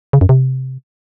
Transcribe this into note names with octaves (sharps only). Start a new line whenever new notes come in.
C#3
F#2
C3